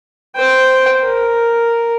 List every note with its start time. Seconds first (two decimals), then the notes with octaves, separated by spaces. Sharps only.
0.36 C5 G5
1.04 A#4